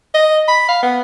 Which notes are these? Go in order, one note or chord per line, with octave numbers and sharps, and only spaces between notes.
D#5
B5
F5
B3